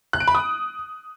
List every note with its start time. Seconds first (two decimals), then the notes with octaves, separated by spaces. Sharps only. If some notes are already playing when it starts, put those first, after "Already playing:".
0.13 F#6
0.20 D7
0.28 B5
0.35 D#6